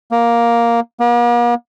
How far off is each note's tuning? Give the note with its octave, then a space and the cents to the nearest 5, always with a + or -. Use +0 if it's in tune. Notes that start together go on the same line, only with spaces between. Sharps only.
A#3 +5
A#3 +45